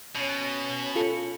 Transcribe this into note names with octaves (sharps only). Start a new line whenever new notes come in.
B2 C#4
F4 A4 C#7